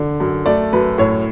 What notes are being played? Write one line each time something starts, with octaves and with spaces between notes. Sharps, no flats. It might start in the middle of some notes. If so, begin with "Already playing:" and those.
Already playing: D3
F#2
A3 D5
F#2 B4
A2 C#5